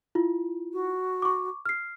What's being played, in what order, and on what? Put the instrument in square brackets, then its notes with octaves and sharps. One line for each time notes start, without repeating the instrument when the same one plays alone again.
[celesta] E4 F4
[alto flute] F#4
[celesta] C#6 D6
F6 C7